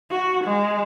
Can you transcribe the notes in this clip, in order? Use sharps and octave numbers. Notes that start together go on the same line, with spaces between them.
F#4
G#3